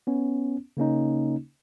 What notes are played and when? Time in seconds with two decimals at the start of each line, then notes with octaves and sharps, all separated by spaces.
0.07 B3 C#4
0.77 C#3 A#3 C#4 D#4